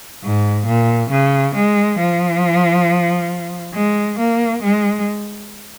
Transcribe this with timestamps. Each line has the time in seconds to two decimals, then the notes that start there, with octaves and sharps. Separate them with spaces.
0.24 G#2
0.67 A#2
1.11 C#3
1.56 G#3
2.00 F3
3.74 G#3
4.19 A#3
4.63 G#3